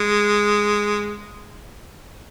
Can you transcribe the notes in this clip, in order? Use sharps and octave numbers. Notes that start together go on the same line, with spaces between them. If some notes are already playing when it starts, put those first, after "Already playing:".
Already playing: G#3